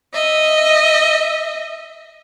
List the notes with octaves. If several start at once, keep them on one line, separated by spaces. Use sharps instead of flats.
D#5 E5